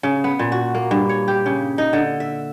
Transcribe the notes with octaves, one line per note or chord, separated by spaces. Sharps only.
C#3
B3
A#2
F#4
A#3
G2
C#5
G4
C#3
D#4
D3
E5